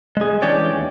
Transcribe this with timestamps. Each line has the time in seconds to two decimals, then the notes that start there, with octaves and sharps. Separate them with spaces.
0.17 G#3 G#4
0.42 E3 C#4 D4 G4 C#5 D5
0.72 D#2